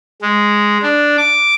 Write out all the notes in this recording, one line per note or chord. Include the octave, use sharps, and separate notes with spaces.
G#3
D4
D6